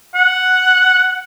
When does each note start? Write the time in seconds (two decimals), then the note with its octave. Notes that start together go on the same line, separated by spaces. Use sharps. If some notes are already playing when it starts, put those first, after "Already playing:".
0.15 F#5